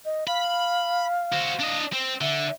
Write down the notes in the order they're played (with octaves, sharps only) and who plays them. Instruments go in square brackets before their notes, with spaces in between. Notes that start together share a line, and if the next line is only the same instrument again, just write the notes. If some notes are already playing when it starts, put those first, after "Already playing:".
[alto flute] D#5
[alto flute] F5 [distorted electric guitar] B5
[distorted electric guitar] F#4 C5
D4 D#5
C4
[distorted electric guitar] D3 [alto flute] E5